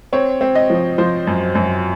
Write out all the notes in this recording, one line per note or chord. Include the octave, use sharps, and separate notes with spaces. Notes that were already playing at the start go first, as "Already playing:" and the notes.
C4 C#5
C4
D#5
F3
F3 C5
F#2
F#2